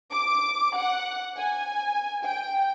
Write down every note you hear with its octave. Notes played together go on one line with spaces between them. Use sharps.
D6
F#5
G#5
G5